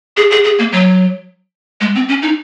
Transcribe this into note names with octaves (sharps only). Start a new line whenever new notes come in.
G#4
G#4
G#4
A#3
F#3
G#3
C4
C#4
D#4